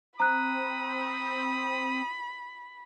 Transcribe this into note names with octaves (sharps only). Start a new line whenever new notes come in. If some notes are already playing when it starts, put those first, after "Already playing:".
C4 A#5 B5 D#6 F#6